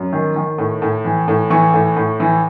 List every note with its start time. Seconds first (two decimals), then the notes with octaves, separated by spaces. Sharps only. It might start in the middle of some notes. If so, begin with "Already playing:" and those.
Already playing: F#2
0.13 D#3
0.36 D#3
0.58 A2
0.82 A2
1.05 E3
1.28 A2
1.50 E3 C#6
1.74 A2
1.96 A2
2.20 E3